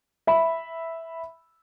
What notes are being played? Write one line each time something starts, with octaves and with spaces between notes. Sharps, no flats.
E5 B5